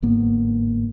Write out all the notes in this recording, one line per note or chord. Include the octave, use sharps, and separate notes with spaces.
G1 G#2 A#3 B3